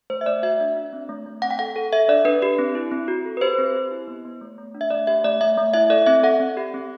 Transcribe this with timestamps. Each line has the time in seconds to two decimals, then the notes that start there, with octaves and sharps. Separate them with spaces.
0.10 A3 C5
0.21 E5
0.26 A3 D5
0.43 F#4 E5
0.60 D4
0.77 D4
0.93 C4
1.09 A3
1.26 A3
1.42 C4 F#5
1.51 G5
1.59 A4 F#5
1.76 A4
1.93 A4 E5
2.08 D4 D5
2.25 D4 B4
2.42 G4
2.59 C4
2.75 E4
2.92 C4
3.08 F#4
3.25 A4
3.37 B4
3.41 G4 C5
3.58 C4
3.75 G4
3.91 E4
4.08 B3
4.25 B3
4.41 A3
4.58 A3
4.75 D4
4.81 E5
4.90 A3 D5
5.07 G4 E5
5.24 A3 D5
5.41 A3 E5
5.58 A3
5.74 E4 E5
5.90 A4 D5
6.06 C4 E5
6.23 A4 F#5
6.40 C4
6.57 G4
6.74 C4